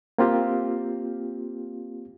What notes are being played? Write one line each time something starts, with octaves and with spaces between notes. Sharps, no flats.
A#3 C4 F4 G4